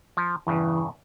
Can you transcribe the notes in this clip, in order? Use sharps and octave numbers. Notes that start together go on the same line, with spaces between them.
F3
E2 G2 C#3 E3